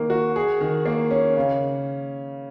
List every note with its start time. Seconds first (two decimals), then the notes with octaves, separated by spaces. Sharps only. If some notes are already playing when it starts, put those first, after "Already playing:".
Already playing: D#3 A#3 A#4
0.10 F#4
0.36 G#4
0.61 D#3
0.85 A#3
1.11 C#4
1.37 C#3